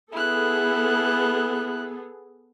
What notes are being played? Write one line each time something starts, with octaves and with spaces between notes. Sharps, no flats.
B3 E4 G#4 A4 F#6